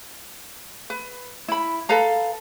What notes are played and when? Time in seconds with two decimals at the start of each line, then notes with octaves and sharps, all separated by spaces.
0.90 B4
1.48 E4 B5
1.89 A4 B4 F5 A#5